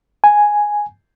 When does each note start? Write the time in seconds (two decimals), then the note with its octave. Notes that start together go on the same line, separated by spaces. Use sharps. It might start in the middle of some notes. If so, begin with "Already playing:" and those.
0.24 G#5